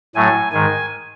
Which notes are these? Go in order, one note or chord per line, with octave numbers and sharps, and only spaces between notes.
A2 F#3 A3 G#5
G#2 D#3 G#3 G#5